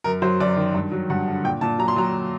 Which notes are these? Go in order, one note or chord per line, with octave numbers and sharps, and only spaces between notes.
F#2 A#4
F#3 C5
F#2 D5
D#3
G2
F#3
G2 F#5
D3
A#2 G5
A#2 A5
F#3 A#5
C6
F#3 A#5